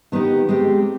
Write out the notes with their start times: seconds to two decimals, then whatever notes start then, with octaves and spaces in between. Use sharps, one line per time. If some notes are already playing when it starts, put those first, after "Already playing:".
0.12 D#3 B3 D#4 G4
0.49 G#3 C4 G4